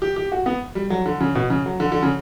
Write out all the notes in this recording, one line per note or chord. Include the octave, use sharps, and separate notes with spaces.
G4
G4
F#4
B3
G3
F#3
D3
C#3
B2
C#3
F#3
D3
D3
C#3